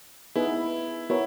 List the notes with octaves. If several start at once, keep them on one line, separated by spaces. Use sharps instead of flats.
B3 D#4 E4 G#4 B4
B3 E4 F#4 A#4 C#5 E5